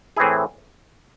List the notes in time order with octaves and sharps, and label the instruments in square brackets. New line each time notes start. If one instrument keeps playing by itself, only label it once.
[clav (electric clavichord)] A2 E3 C4 E4 G#4